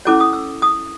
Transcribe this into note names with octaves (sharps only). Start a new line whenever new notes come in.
C#4 E4 A4 C#5 D6
D#6
E6
D#6